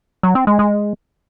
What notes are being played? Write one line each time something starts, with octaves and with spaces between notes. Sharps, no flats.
F#3
C4
G#3
G#3